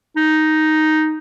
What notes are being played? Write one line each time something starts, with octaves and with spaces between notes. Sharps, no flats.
D#4